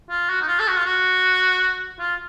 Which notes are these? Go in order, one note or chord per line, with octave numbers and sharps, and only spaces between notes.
F4
F#4
D#4
F4
A4
F#4
F4
F#4
F4